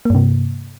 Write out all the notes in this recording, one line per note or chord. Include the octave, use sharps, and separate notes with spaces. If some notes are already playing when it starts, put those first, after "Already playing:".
G2 C3 A#3